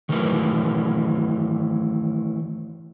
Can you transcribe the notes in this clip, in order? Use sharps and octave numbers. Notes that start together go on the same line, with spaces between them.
D#3 E3 F#3 A3 A#4 B4